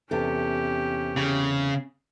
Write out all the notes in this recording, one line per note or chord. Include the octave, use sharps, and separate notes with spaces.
E2 C3 C#4 G4 A4
C#3